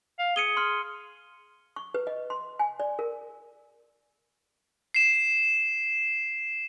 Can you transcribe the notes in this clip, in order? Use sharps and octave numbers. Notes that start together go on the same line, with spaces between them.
F5
G#4 C#7 D#7 G7
C6 F6
C#6
B4
D#5
C6
G#5
D5
A#4
C7 E7